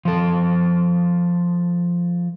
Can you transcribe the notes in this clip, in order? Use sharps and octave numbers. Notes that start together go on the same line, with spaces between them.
F3 A4